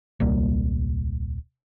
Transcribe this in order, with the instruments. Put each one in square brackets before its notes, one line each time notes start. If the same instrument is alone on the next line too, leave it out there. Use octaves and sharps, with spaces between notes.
[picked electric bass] D#1 C2 G3 A#3